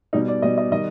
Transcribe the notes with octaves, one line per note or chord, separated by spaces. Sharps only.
B2 G3 D#4
D5
B2 G3 D#5
D#5
D#3 G3 D#5